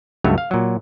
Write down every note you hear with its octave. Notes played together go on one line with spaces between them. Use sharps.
C#2 G2 F#3 A3 C#5
F5
A#2 F#3